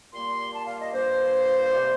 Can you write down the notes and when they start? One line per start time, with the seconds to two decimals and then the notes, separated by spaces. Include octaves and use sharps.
0.13 A#2 G3 A#3 C6
0.53 A5
0.66 F5
0.80 D#5
0.93 G2 F3 A#3 C5
1.73 C3 G3 A#3